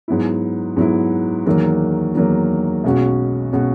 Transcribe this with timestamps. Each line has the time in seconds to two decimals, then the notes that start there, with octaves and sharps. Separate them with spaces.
0.08 G#2 F#3 B3 E4
0.76 G#2 F#3 B3 E4
1.46 E2 D#3 F#3 A#3
2.15 E2 D#3 F#3 A#3
2.84 B1 B2 G#3 C#4 F#4
3.53 B2 G#3 C#4 F#4